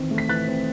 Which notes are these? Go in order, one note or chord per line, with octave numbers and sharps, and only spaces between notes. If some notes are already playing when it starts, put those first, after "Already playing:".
Already playing: D#3 E3 C4
A3
B6
E3 F#6 A6
C4